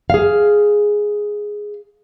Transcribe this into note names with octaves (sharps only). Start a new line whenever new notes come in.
G#4 F5